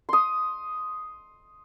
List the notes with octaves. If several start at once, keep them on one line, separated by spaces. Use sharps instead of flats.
C6 D#6